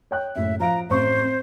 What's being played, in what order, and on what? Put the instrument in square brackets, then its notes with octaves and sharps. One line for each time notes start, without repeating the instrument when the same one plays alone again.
[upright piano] C#5 G5 F#6
[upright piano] F#1 A2 [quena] E5
[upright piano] F3 F5 D7 [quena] A#5
[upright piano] A1 C4 C#6 [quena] C5
[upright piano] C4